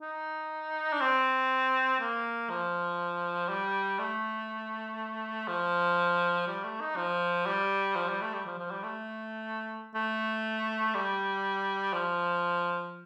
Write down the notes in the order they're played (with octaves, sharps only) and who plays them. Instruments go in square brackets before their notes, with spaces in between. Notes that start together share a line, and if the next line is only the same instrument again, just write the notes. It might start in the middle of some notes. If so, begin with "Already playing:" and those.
[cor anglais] D#4
D4
C4
A#3
F3
G3
A3
F3
G3
A3
D#4
F3
G3
F3
G3
A3
G3
F3
F3
G3
A3
A3
G3
F3